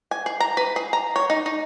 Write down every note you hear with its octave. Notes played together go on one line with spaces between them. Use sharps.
G#5
G#4
A#5
B4
G#4
A#5
C#5
D#4
D#4